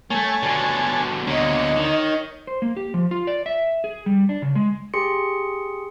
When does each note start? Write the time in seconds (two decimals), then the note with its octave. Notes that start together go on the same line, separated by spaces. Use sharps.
0.10 A3 A#3 C#5 G#5 A5
0.43 B2 D3
1.27 D2 B2 A#3 C#5 D#5
1.76 D#3
2.47 C5
2.62 A#3
2.77 G4
2.94 F3
3.11 F4
3.27 D5
3.46 E5
3.84 G#4
4.06 G3
4.29 D4
4.42 C#3
4.55 G#3
4.94 G4 G#4 C6 C#7